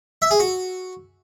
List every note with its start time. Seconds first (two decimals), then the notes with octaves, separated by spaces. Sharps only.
0.22 E5
0.31 G#4
0.40 F#4